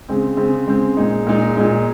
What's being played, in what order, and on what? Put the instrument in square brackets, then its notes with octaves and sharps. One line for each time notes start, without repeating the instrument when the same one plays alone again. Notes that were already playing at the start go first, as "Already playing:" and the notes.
[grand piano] C#3 G#3 C4
C#3 G#3 C4
C#3 G#3 C4
A#2 G#3 D#4
A#2 G#3 D#4
A#2 G#3 D#4